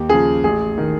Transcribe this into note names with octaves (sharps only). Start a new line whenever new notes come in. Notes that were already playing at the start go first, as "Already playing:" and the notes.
Already playing: D#2 G4
C#3 F3 G#4
A1 G#4
D#3